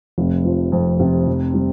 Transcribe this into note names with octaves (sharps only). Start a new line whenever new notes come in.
F1
F3
F2
C3
F1
G3